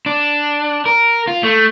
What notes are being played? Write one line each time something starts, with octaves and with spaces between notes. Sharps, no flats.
D4
A#4
F4
A3